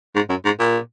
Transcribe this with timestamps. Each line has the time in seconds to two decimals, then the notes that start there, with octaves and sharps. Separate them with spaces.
0.15 G#2
0.29 F#2
0.45 G#2
0.59 A#2